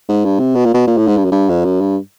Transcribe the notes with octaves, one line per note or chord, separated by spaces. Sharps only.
G#2
G2
C3
B2
A#2
B2
A#2
A2
G#2
G2
F#2
G2
F2
F#2
G2